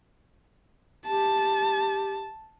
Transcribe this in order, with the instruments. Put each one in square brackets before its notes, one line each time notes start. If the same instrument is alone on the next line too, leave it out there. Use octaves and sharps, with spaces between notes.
[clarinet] G4 [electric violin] A5